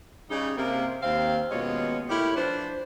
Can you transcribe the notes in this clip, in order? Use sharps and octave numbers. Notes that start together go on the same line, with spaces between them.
C#3 G3 D#4
C3 A#3
D#2 C4 F5
D#2 B2 G#3 C#4 F4 C#5
A3 E4 G4 A#4 C#5
F3 D4 B4 C5